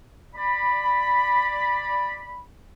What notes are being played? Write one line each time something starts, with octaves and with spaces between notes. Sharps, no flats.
D5 B5